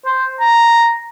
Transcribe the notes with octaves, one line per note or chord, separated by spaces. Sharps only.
C5
A#5